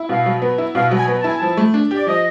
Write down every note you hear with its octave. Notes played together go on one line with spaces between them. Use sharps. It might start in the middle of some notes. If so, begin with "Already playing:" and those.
Already playing: E4
B2 F5
F#3
B3
E4
B2 F5
F#3
G#5
B3
A5
E4 G#5
F3 A5
A3
D4
G4 D5
F3 D#5